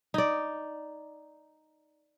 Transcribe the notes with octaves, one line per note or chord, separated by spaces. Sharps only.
D#4 D5